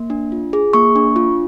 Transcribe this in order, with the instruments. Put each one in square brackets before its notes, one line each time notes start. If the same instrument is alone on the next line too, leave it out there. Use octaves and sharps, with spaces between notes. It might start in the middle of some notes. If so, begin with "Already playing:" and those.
Already playing: [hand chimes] A#3
D4
F4
G#4
A#3 C#6
D4
F4